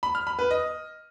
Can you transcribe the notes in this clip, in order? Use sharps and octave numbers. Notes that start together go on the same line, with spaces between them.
B5
F6
B5
B4
D#5